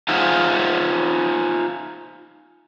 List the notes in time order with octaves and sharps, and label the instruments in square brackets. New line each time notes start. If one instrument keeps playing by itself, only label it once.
[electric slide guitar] D#4 F4 G#4 C5 E5 F#5